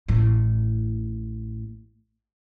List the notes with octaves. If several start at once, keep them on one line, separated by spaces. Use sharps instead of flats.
A1 A2